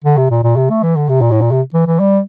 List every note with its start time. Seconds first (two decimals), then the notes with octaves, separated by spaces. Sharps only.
0.04 D3
0.17 C3
0.31 A#2
0.43 A#2
0.56 C3
0.70 A3
0.83 E3
0.96 D3
1.09 C3
1.21 A#2
1.31 A2
1.41 A#2
1.51 C3
1.74 E3
1.87 E3
2.00 G3